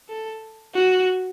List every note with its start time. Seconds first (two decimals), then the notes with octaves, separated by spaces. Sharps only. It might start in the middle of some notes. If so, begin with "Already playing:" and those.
0.09 A4
0.74 F#4